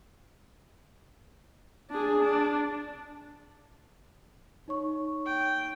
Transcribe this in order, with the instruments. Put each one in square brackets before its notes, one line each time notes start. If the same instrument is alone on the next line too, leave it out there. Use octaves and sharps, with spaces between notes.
[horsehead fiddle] D4 G#4
D4
[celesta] D#4 C#5 C#6
[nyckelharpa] G5